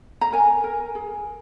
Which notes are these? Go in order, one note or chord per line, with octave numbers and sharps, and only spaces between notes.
A#5
A#4 G#5
A#4
G#4